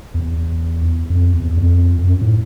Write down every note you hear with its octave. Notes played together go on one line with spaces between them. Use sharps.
E2
F2
E2
F2
F2
F#2
A2